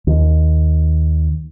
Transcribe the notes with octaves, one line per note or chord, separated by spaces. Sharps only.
D#2